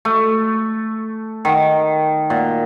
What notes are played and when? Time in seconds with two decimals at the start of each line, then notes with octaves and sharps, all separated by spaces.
0.05 A3
1.45 D#3
2.30 A#2